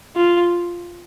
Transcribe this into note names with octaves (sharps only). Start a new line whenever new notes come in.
F4